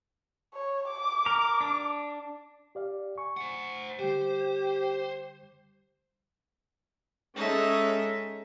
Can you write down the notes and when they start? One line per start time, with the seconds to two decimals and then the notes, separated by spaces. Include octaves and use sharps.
0.54 C#5
0.87 D6
1.26 A#4
1.61 D4
2.75 G4 D5 F5
3.18 G#5 C#6
3.37 C5 F#5
3.99 D3 G3 G4 C5
7.36 G#3 C#4 D#4 A4 E5